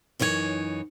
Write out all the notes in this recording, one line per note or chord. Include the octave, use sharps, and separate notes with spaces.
F#2 E3 D#4 F4 C#5